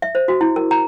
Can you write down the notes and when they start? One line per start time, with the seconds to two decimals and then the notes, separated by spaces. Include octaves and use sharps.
0.02 E5
0.15 C5
0.28 F#4
0.41 E4
0.56 A#4
0.71 A#5